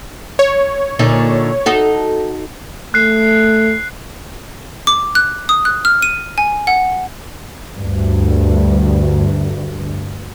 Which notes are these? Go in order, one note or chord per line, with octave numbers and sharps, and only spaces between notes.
C#5
A#2 D3 D#4
D#4 F#4 A4
A3 F#6 C7
D6
F#6
D#6
F#6
F6
D#7
G#5
F#5
D2 G2